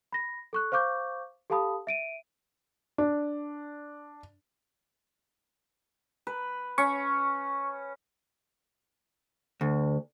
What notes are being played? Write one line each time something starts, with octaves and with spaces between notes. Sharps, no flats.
B5 A#6
A4 C#6 F#6
C5 F5 C#6 D6 G6
G4 A4 F5 A5 B5 D#6
E5 D7 D#7
D4
B4
C#4 C#6
D2